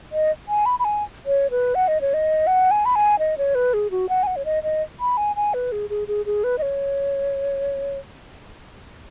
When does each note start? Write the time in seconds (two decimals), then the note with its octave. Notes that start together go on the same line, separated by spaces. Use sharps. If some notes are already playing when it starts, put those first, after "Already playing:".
0.12 D#5
0.48 G#5
0.66 B5
0.79 B5
0.85 G#5
1.26 C#5
1.51 B4
1.75 F#5
1.88 D#5
2.01 C#5
2.14 D#5
2.47 F#5
2.71 G#5
2.85 B5
2.96 G#5
3.19 D#5
3.38 C#5
3.55 B4
3.74 G#4
3.91 F#4
4.09 F#5
4.23 G#5
4.27 F#5
4.36 C#5
4.45 D#5
4.63 D#5
5.00 B5
5.17 G#5
5.36 G#5
5.54 B4
5.72 G#4
5.90 G#4
6.08 G#4
6.26 G#4
6.44 B4
6.58 D#5
6.62 C#5